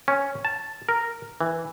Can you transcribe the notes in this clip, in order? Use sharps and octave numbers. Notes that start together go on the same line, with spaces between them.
C#4
A5
A#4
E3